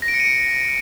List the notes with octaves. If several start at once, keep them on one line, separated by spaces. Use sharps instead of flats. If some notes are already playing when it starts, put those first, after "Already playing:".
A#6
D7
C#7
D#7
D7